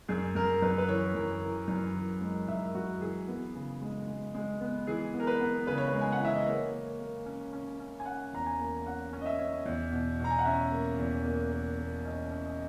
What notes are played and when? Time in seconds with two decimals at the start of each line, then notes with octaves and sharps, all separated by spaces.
0.08 F#2 G#4
0.35 F#2 A#4
0.62 F#2 B4
0.78 B4
0.88 E3 C#5
1.15 F#2
1.42 E3
1.68 F#2
1.95 E3
2.21 G#3
2.48 F#2 E5
2.75 F#2 F#4
3.01 E3 G#4
3.28 B3
3.54 C#3
3.82 G#3
4.07 G#3
4.35 G#3
4.61 B3
4.87 E3 G#4
5.14 B3
5.20 A#4
5.27 B4
5.40 B3
5.67 C#3 B4
5.78 C#5
5.88 B4
5.93 G#3
6.01 G#5
6.12 F#5
6.20 E3
6.25 E5
6.35 D#5
6.47 A#3 C#5
6.73 A#3
6.99 A#3
7.26 C#4
7.53 C#4
7.80 C#4
8.00 G#5
8.06 C#4 F#5
8.33 E2 A#5
8.46 G#5
8.59 A#3
8.86 C#4 F#5
9.13 C#4
9.22 D#5
9.26 E5
9.39 C#4
9.65 E2
9.92 B2
10.19 B2
10.24 A#5
10.31 G#5
10.39 F#5
10.45 C#4 E5
10.72 A#3
10.98 E2
11.25 A#3
11.52 A#3
11.79 A#3
12.05 C#4 D#5
12.31 C#4
12.45 D#5